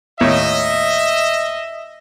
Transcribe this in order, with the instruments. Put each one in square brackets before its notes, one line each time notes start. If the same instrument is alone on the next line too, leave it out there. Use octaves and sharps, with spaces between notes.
[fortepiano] D#2 A2 C#5 [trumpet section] D#5 E5